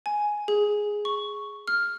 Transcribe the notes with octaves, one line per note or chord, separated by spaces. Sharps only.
G#5
G#4
C#6
F6